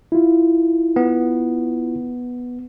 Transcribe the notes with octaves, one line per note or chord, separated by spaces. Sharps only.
E4 F4
B3